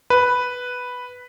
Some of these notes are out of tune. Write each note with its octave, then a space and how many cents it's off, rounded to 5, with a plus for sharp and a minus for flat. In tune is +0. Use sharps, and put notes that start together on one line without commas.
B4 +0